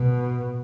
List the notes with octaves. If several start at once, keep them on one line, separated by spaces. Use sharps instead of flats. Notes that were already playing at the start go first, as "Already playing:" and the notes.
Already playing: B2